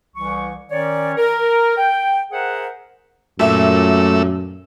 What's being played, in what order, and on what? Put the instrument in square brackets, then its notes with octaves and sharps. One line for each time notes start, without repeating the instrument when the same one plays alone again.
[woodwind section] C2 E3 C#6
D#3 C#4 C#5 D5
A#4
G5
G#4 A#4 C5 E5 F#5
[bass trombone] F#2 [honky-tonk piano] A#2 E5 E7 [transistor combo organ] A3 E6